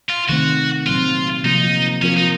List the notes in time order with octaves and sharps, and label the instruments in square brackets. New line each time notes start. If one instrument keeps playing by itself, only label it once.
[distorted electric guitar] F4
[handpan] C3 D#3 A3 C4 [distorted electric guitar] F#4
[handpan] A#2 F#3 C4 [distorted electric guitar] F4
[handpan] C3 F3 A#3 F4 [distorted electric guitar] D#4
[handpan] F3 C4 F4 A#4 [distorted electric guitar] C#4
[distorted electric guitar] D#4